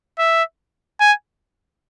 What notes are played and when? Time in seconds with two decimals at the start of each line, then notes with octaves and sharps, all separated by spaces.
0.19 E5
1.00 G#5